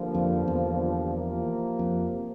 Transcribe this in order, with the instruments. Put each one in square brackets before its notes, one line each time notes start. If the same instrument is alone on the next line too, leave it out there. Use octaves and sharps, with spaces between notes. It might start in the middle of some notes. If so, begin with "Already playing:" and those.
Already playing: [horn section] G2 D3 F3 A#3
[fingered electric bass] F2
E2
[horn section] C3 F3 A#3
[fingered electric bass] F2